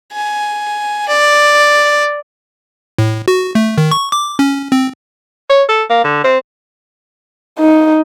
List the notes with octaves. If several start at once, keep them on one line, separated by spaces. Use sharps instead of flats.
G#5
D5
A2
F#4
A3
D#3
C#6
D6
C#4
C4
C#5
A4
A#3
D3
C4
D#4